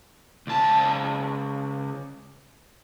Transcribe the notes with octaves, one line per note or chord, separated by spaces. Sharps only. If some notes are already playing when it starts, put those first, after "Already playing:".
C#2 A5